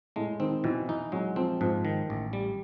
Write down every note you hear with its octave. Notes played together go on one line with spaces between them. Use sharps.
A2 G#3
D#3 C4
B2 E3
E3 D#4
F#3 G#3
F3 C4
G#2 F3
D#3
A1
G3